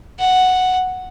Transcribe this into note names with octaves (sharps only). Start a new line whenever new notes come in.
F#5